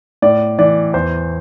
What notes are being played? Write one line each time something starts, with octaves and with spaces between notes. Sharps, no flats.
A2 D5
E3 D5
E2 C5